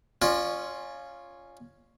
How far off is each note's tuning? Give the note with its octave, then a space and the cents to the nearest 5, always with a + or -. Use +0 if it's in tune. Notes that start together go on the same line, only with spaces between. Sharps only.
C#4 +0 F4 +0 D5 +40